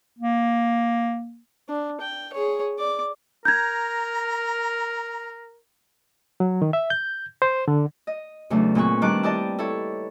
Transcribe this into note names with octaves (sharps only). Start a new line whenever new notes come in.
A#3
D4
G5
G#4 C#5
D5 D6
A#4 A#5 G6 G#6
F#3
D#3
E5
G6
C5
D3
D#5
E2 C#3 F#3 A3 D4
A#2 C4 G#4 B4 C#6
D#3 G3 D4 A5 D6 F#6
E4 G4 D5 D#5 A5
E4 A4 C#5